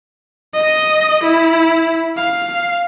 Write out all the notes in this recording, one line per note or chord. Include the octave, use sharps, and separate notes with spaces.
D#5
E4
F5